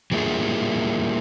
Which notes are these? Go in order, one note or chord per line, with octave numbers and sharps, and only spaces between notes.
E3 G3 A#3 E4 F4 G#4